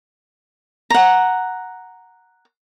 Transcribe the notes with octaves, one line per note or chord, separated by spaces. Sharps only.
F#5 A#5